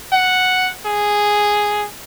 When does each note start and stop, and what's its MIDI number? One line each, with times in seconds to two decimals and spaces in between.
0.12 0.70 78
0.86 1.86 68